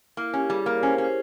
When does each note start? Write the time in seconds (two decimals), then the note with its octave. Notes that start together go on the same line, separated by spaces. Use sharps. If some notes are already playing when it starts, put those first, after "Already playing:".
0.17 A#3 E4
0.34 C#4 G4
0.50 G3 G#4
0.66 A#3 A#4
0.75 C#5
0.83 C#4 C5
0.98 C#4
1.04 C5